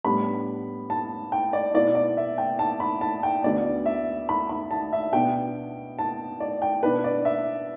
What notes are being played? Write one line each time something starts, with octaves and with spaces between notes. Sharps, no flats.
A2 G3 B3 D4 B5
A5
G5
D5
B2 B3 E4 D5
D5
E5
G5
A5
B5
A5
G5
D2 D3 B3 D5
E5
B5
B5
A5
E5
B2 B3 D4 G5
A5
D5
G5
B2 B3 D4 B4
D5
E5